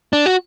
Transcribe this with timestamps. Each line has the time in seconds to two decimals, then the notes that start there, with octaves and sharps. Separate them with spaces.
0.13 D4
0.26 F#4